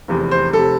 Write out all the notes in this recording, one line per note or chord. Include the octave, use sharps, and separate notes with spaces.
F1 E2 C3
C5
F1 C3 A4